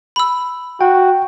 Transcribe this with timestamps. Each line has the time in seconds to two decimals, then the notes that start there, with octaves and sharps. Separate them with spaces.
0.16 B5 E6
0.81 F#4 G5